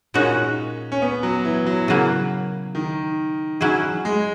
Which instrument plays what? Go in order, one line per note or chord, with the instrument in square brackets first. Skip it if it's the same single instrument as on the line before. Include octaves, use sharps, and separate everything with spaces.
[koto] A#2 G#3 D#4 F#4 [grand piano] C#4
[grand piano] C#4
B3
F#3
E3
F#3
[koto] C#3 F#3 A#3
[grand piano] D#3
[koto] F#3 C#4 E4 G#4
[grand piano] G#3